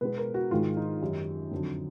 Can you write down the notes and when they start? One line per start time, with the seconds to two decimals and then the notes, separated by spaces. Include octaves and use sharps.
0.01 B2 G#3 B3 B4
0.18 A#4
0.34 F#4
0.51 G#2 D#3 G#3 F4
0.77 D#4
1.01 F#2 D#3 G3
1.51 F2 D3 F#3